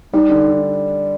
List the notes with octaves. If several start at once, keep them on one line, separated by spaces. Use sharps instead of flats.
G3 D#4
D3
D4